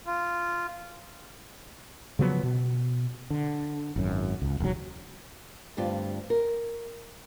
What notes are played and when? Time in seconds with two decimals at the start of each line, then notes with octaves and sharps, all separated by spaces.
0.07 F4
2.19 C#3 F3 F#3 B3
2.43 B2
3.30 D3
3.96 G#1 F#2
4.42 C#2
4.60 E1 F#3
5.77 D2 G2 C4 F4 G4 D5
6.30 A#4